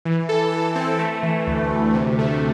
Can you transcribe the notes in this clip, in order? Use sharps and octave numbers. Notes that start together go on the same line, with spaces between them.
E3
A4
E3
C4
A3
E3
D2
D2
C3
A3